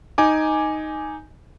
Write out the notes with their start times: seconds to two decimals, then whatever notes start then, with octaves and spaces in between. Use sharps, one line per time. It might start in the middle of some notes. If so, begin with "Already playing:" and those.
0.18 D#4 G#5 D6